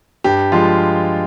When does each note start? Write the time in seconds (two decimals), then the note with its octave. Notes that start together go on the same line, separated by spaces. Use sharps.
0.24 G2 G4
0.52 F3 G#3 F4